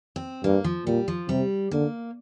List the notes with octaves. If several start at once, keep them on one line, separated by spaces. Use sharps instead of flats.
C4
G2 A#3
F3
A#2 G3
F3
C3 G3
D3 A#3